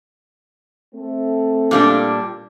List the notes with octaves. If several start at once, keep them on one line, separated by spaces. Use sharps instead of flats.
A3 C4
A#2 G3 D4